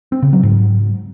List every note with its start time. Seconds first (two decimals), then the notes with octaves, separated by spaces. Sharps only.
0.12 C4
0.22 C#3
0.33 F#3
0.43 G#2